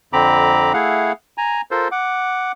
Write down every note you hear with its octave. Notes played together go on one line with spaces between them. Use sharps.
F2 D3 C4 A#5 B5 D6
A3 E4 G#4 F5 F#5
G#5 A#5
F4 A4 A#4 C5
F#5 D6